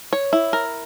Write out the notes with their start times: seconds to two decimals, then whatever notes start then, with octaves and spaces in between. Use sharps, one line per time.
0.13 C#5
0.33 E4
0.53 A#4